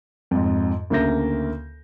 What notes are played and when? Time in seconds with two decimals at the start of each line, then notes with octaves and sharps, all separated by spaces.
0.31 F2 G#2
0.90 D2 C#3 A#3 E5 G6 A#6